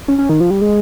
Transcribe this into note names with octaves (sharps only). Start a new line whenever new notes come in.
C#4
C#4
D#3
F3
G3
G#3